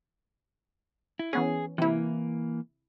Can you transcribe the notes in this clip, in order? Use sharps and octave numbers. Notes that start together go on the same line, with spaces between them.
E4
E3 B3 C#4 G#4
C3 E3 A#3 E4